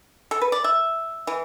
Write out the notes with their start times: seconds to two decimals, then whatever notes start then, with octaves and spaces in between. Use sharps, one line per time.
0.31 A4
0.41 B4
0.52 D5
0.64 E5
1.27 E3